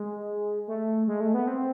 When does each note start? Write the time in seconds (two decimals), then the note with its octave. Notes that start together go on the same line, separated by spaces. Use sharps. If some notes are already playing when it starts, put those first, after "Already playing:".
Already playing: G#3
0.68 A3
1.08 G#3
1.20 A3
1.34 B3
1.48 C4